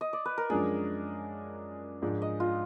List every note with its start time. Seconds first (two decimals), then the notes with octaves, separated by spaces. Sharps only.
0.01 D#5
0.13 D5
0.25 B4
0.38 A#4
0.50 F#2 F3 G#3 D4 G#4
2.02 G#2 F3 G#3 D4
2.22 D#5
2.40 F4